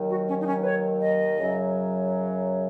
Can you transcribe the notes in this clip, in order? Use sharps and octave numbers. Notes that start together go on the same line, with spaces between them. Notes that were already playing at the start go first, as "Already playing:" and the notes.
Already playing: D#2 D#3 F#3
F#4
C#4
D#4
C#4
B4
C#5
D#5
F#2 C#3 F#3